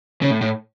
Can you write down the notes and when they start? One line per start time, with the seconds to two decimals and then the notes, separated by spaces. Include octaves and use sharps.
0.22 C#3
0.31 A2
0.41 A2